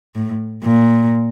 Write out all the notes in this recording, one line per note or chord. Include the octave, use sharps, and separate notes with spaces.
A2
A#2